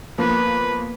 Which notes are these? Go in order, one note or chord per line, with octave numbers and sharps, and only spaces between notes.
F3 A#3 B3 B4